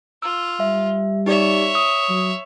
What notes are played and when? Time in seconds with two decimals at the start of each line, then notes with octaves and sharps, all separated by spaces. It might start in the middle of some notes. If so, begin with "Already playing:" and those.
0.22 F4 E6
0.60 G3 E5
1.26 D#4 G4 C#5 D5 E5
1.75 D#6
2.09 F#3